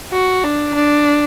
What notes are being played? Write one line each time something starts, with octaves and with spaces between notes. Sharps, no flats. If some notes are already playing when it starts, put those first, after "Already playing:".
F#4
D4
D4